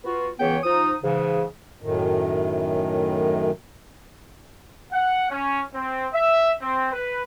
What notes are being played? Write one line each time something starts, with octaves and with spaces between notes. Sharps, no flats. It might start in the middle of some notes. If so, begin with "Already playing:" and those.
B3 F4 F#4
C#2 C#3 E3 B3 C#5 G5
F3 D#4 D#6
G#2 C#3 E3
F#2 A2 D#3
F#5
C#4
C4
E5
C4
B4